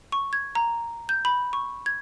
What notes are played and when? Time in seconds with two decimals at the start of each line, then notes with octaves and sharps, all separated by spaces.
0.12 C#6
0.33 G#6
0.55 A#5
1.09 G6
1.25 B5
1.53 C#6
1.86 G#6